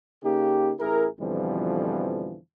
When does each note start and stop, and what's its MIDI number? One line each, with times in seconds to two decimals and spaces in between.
0.24 0.74 49
0.24 0.74 58
0.24 0.74 63
0.24 0.74 67
0.80 1.07 33
0.80 1.07 64
0.80 1.07 68
0.80 1.07 70
1.20 2.37 41
1.20 2.37 47
1.20 2.37 50
1.20 2.37 52
1.20 2.37 53
1.20 2.37 55